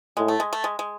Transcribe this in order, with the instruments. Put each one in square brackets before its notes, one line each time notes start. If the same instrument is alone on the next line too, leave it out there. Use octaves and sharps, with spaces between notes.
[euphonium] A2 [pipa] G#3
[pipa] A3
G#3
A3
G#3
G#3